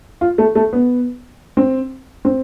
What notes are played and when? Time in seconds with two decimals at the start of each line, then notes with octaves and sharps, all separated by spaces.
0.21 F4
0.38 A3
0.55 A3
0.73 B3
1.57 C4
2.25 C4